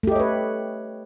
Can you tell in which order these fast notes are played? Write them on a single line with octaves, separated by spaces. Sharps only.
A3 G4 D#5 C#5 B4